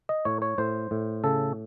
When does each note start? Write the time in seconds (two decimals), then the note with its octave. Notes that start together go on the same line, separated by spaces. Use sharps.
0.09 D#5
0.25 A2 C#5
0.42 C#5
0.58 A2 C5
0.91 A2
1.24 C#3 A4